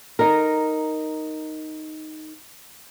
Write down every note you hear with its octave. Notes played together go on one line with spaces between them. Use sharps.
D#4 A#4